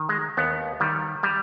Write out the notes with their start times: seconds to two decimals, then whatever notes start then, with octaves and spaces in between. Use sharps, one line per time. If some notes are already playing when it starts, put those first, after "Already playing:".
Already playing: D#3
0.09 G#3
0.37 D#2 B3
0.80 D#3 G3
1.23 G3